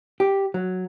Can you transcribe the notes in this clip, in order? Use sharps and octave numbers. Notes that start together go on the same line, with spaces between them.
G4
F#3